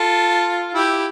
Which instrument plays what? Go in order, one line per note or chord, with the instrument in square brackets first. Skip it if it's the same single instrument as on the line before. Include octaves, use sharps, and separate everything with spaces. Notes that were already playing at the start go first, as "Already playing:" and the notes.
Already playing: [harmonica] F4 A4
E4 G4